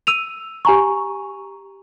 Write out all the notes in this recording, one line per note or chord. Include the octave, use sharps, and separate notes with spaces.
E6 D#7 F7
G4 G#5 A#5 C#6